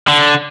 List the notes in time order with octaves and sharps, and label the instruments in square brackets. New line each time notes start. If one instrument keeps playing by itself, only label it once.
[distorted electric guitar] D3